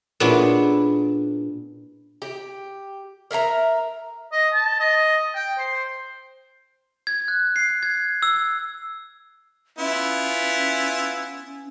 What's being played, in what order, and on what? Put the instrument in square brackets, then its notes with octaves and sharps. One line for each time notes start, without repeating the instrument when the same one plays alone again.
[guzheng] A#2 B3 C#4 D4 E4 G#4
[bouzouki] G4
A#4 E5 F5 A#5
[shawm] D#5
A5
D#5
G5
C5
[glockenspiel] G#6
F#6
C7
G#6
E6
[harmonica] B3 E4 F4 [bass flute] C#4